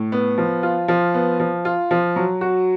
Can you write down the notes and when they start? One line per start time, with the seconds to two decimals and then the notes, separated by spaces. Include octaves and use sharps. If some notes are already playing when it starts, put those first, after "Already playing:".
Already playing: A2
0.12 B3
0.38 F3
0.63 F4
0.88 F3
1.14 B3
1.40 F3
1.65 F4
1.91 F3
2.16 F#3
2.41 F#4